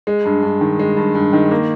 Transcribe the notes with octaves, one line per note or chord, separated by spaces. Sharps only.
G#3
G2
G2
D#3
G#3
G2
G2
D#3
A#3